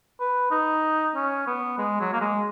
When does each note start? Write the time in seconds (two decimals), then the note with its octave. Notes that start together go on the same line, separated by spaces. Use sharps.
0.20 B4
0.51 D#4
1.15 C#4
1.47 B3
1.78 G#3
2.00 F#3
2.13 A#3
2.21 G#3